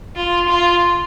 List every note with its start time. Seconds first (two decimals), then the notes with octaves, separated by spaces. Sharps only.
0.16 F4
0.49 F4